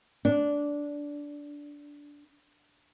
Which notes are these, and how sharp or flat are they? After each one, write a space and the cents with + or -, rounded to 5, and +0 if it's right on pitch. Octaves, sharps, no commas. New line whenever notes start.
D4 -10